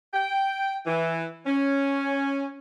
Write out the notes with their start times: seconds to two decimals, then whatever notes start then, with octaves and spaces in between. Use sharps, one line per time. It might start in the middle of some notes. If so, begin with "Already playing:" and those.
0.13 G5
0.86 E3
1.45 C#4